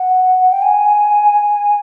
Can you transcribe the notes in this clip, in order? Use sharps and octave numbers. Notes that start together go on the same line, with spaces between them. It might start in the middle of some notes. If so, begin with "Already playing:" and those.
Already playing: F#5
G5
G#5